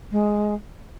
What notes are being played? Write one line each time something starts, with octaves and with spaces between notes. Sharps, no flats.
G#3